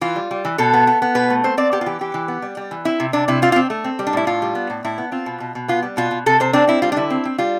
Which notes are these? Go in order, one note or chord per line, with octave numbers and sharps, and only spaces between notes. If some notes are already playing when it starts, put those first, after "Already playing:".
E3 F4
G3
G3
E3
B2 A4
B3
B3
B3
B2 B4
A3
C4 C5
C4 D5
B3 G4
F4
E3 G4
E3 G4
E3
B3
G3
G3
E3
C4 E4
C3
C3 D4
C3 E4
C4 F4
F4
C4
A3
C4
G3
D4
A2 E4
A2 F4
G3
B3
A2
A2 E4
B3
C4 F4
B2
B2
B2
B3 F4
G3
B2 F4
B2
C3 A4
C3 C5
C4 D4
C4 E4
G3 F4
D4
D3 E4
C4
C4
G3 F4